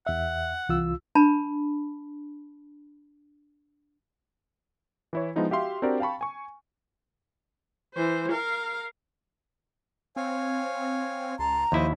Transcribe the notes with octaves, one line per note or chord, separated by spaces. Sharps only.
E2 E5 F#5
C2 E3 F4 E6
D4 A5 B5
E3 E4 C#5
F3 G#3 B3 D#4 E4
F#4 G4 E5 F5 C6
C4 D4 F#4 G4 A#4 D5
F5 G5 A5 B5 C#6
G#5 C#6
E3 C5
A#4 F5
C4 C#5 F5 G#5
C#2 A5 A#5 C6
D#2 F3 E4 C5 D#5